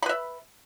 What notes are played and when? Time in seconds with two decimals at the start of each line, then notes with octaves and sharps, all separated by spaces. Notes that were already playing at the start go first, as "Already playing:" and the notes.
0.02 B5
0.06 B4
0.09 E5